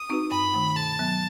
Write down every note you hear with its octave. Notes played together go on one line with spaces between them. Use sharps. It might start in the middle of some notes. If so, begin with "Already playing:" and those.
Already playing: D#6
C4 D#4 F#4 B4
G2 B5
D#3 A3
B2 A5
F#3 B3